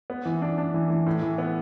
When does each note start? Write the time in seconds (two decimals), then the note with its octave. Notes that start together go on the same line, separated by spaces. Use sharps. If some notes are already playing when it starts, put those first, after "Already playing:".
0.10 B3
0.25 E3
0.42 D4
0.58 D4
0.74 E3
0.90 E3
1.07 A2
1.22 E3
1.38 B3